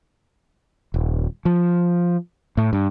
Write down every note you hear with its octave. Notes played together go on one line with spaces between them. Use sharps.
D#1
F3
A2
G2